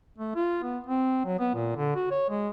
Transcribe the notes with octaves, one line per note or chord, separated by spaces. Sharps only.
A3
F4
B3
C4
F#3
B3
A#2
D3
F#4
C#5
G#3